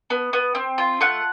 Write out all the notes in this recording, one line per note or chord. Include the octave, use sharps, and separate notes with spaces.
B3
B3
C4
F4
A3 F#5